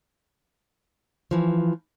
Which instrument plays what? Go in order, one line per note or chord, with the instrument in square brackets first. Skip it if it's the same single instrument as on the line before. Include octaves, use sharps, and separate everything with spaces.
[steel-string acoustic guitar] E3 F3